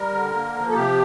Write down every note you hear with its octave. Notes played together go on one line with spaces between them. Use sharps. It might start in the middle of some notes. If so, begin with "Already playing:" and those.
Already playing: G3 A#4
D3
A#3
F3
A4
C3 G4